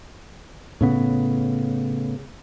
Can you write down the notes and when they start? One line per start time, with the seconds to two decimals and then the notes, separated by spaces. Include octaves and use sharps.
0.81 A2 C#3 B3